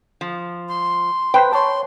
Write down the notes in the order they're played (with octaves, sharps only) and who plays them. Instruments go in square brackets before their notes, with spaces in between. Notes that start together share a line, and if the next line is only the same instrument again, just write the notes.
[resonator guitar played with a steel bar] F3
[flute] C6
[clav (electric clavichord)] B4 C5 [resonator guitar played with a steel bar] G5
[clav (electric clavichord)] C#5 A5 [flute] C6